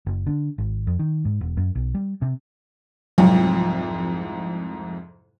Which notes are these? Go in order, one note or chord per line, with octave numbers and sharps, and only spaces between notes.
F#1
D3
G#1
F2
D#3
G#2
E1
F#2
B1
G3
C3
C2 F2 G#2 F#3